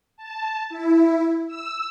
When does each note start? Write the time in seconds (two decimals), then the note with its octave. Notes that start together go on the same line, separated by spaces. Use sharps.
0.17 A5
0.70 E4
1.47 E6